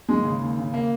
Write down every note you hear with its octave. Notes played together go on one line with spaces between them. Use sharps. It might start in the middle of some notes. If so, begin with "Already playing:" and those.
D#2 G#3
C#3
D#2
C#3
A#3